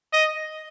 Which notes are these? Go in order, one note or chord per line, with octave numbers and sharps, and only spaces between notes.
D#5